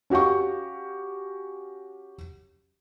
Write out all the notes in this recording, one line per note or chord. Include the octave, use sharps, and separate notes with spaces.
C#4 F#4 G4 F5 C#6